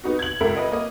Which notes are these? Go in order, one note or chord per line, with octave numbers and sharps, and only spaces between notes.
B3 D#4 F#4
G#6 F#7
C#2 A4 A#4 E5
B4 D#5
A#3 D#5